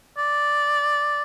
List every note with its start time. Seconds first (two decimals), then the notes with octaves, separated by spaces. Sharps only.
0.17 D5